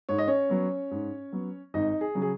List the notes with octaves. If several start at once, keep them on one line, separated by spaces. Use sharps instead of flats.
G#2 C#5
D#5
C#4 C#5
F#3 B3
G#2
F#3 B3
G#1 D#4 D#5
G#4
C#3 F#3
G#4